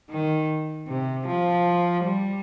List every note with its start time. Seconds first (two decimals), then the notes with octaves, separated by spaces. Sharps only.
0.11 D#3
0.88 C3
1.27 F3
2.05 G3